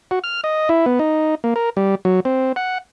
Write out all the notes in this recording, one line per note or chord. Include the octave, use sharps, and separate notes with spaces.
F#4
F6
D#5
E4
B3
D#4
A#3
A#4
G3
F#3
C4
F#5